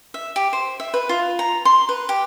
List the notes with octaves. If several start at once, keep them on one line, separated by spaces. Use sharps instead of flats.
E5
G4
C5
E5
B4
F4
A#5
C6
B4
G4